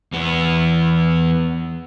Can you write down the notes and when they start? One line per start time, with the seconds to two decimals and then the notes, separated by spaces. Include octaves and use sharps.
0.13 E2 B3